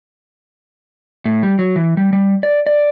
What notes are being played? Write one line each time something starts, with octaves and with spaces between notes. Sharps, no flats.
A2
G3
F#3
E3
G3
G3
D5
D5